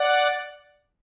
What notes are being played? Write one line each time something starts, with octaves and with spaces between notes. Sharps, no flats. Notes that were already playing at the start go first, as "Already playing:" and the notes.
Already playing: D5 F#5